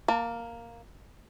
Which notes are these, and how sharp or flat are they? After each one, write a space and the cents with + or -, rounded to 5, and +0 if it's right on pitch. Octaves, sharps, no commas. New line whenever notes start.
A#3 +0 A5 +35